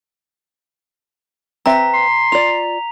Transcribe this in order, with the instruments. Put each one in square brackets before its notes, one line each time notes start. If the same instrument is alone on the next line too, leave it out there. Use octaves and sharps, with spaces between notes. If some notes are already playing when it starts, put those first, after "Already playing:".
[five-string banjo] C4 B4 E5 [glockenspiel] A#5 B6
[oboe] C6
[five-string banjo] F4 D5 [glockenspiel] F7